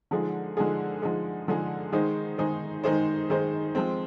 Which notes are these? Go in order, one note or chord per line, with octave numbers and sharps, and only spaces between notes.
D3 F3 G#3 D#4 G#4
D3 F3 G#3 D#4 G#4
D3 F3 G#3 D#4 G#4
D3 F3 G#3 D#4 G#4
D#3 G#3 D#4 G#4 C5
D#3 G#3 D#4 G#4 C5
D#3 G#3 D#4 G#4 C5
D#3 G#3 D#4 G#4 C5
F3 G#3 C4